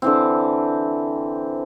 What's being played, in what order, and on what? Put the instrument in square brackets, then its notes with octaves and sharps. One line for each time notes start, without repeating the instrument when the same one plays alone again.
[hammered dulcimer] D3 E3 C4